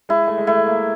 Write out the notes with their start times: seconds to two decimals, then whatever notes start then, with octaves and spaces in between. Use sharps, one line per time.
0.09 G#3 E4
0.28 A3
0.38 G#3
0.47 A3 E4
0.66 A#3